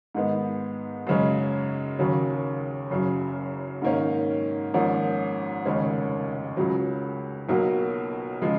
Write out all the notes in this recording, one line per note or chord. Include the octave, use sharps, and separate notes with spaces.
G#2 D#3 G#3 B3
F#2 C#3 G#3 C#4
D#2 C#3 F#3
F#1 F#2 C#3 F#3
G#2 D#3 A#3 C#4
G#1 G#2 F3 A#3 C#4
F1 D#2 C#3 G#3 C#4
C#2 C#3 F#3
B1 B2 F#3 A#3
C#3 F3 G#3